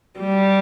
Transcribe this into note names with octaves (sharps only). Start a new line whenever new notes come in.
G3